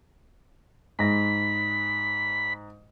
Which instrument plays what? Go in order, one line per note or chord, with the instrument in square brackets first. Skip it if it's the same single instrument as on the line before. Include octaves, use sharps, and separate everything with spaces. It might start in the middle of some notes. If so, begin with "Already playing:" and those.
[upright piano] G#2 A#6 [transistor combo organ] B5